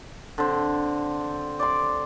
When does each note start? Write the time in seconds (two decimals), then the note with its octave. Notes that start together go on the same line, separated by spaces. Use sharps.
0.38 D3 C4
1.60 D5 C6